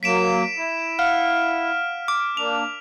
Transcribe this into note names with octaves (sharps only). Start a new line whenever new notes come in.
F#3 A#3 B6 D7 E7
E4
F5 F#5 F6
D6
A#3 D4 F7